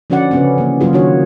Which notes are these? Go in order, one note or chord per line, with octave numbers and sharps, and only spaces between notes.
D3 F3 C#4 F#4 D5 F#5
C#3 B3 C#4
E3 A#3
C#3 F#3 A#3 F4 G#4
D#3 D4 F#4 C#5